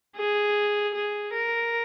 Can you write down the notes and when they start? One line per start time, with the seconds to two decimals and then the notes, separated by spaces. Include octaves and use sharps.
0.16 G#4
0.94 G#4
1.32 A#4